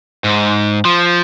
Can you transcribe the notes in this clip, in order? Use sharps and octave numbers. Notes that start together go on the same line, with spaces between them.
G#2
F3